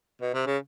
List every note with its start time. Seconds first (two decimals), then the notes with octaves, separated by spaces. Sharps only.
0.21 B2
0.34 C3
0.47 C#3